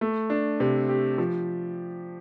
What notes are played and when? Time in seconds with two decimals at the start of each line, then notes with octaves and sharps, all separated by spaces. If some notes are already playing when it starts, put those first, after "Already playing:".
0.01 A3
0.30 D4
0.60 C3
0.89 G4
1.18 F3